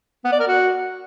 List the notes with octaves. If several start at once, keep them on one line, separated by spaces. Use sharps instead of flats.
B3
D5
A#4
F#4